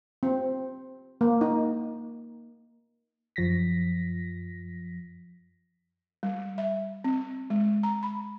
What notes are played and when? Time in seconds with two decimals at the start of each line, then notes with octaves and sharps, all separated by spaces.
0.23 C4
1.21 A#3
1.41 D#4
3.36 F#2 F3 A#6 B6
6.23 G3
6.58 E5
7.04 C4
7.50 G#3
7.83 A#5
8.03 B5